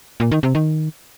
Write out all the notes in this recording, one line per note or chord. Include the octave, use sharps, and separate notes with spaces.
A#2
D#3
C3
D#3